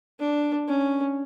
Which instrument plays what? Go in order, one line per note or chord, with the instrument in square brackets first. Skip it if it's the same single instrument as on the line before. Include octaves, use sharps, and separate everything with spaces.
[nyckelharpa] D4
C#4